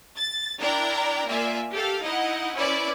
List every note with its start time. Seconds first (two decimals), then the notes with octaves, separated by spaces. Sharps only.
0.17 A6
0.60 D4 E4 A#4 D5 G5 A#5
1.26 A#3 F4 D5 E5 G#5
1.72 G4 A4 F5
2.03 D#4 E4 D#5 F#5
2.55 C#4 E4 B4 C5 D5